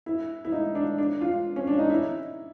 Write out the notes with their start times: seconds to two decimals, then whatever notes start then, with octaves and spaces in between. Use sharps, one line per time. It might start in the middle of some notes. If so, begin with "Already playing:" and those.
0.06 E4
0.45 E4
0.52 D#4
0.75 D4
0.98 D4
1.21 F4
1.56 C#4
1.67 D4
1.79 D#4
1.90 E4